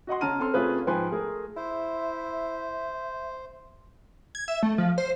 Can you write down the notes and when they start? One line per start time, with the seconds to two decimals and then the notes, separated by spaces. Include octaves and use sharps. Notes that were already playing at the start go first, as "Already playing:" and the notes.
0.07 F#4 D#5 F#5 C6
0.21 C#3 A5 A#5 F6 D#7
0.39 C4 A4 C6 F6
0.54 C3 A3 C#4 F4 G#4 B4
0.87 G#2 F3 B4 G5 G#5 C6
1.11 A3 G#4 A#4
1.57 E4 C5 E5
4.35 G#6
4.48 E5
4.63 A3
4.78 F3
4.98 C5